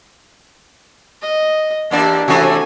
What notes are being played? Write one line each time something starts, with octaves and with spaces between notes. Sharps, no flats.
D#5
E2 A#3 D4 G4 D5
C3 E3 A3 D4 F#4 G#5